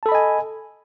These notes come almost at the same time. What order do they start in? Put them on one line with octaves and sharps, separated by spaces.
A5 A4 B5 D#5 G#5